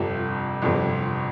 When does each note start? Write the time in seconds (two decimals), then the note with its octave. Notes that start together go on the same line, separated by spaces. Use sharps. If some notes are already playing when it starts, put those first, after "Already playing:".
Already playing: G1 F2 C3 F3
0.62 G1 F2 C3 F3